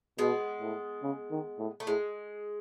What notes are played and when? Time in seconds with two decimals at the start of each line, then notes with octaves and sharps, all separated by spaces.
0.18 B2 G#3 B3
0.60 A2
1.03 C#3
1.31 D#3
1.59 A2
1.80 A3
1.86 A2 G#3